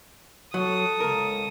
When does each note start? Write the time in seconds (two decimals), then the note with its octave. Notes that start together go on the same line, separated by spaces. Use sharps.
0.54 F#3 A4 D#6
1.00 C#2 A#4